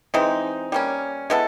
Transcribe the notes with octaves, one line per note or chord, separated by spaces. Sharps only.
E3 G#3 C4 D#4
G3 A#3 C#4
G#3 B3 E4 A4